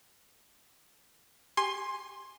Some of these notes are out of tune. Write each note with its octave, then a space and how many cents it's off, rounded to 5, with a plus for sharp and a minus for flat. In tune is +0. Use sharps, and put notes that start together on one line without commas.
G4 +0 G#5 -10 C6 +15